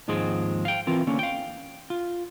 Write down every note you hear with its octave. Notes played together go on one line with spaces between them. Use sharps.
D#2 G#2 F3 G#3 C4 G#4
F5 G5
E3 C4 F4 A#4
D3 A#3 C#4
F5 G5
F4